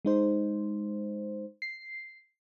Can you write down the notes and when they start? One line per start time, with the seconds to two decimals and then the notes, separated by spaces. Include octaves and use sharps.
0.05 G#3 D#4 C5
1.62 C7